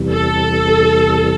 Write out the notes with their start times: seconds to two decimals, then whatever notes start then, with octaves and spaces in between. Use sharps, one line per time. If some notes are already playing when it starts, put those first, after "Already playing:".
Already playing: E2 C3 E3 G3
0.09 A4